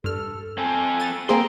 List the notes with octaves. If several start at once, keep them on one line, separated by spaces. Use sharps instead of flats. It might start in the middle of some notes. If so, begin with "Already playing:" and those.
G2 A4 F6
C4 A4 G#5
A6 D#7
A#3 C4 G#4 G5 A#5 C6